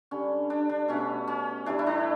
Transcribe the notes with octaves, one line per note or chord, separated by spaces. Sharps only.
D3 G3 C#4
D4
D4
B2 A3 C#4
C#4
A2 E3 G3 D4
E4
D4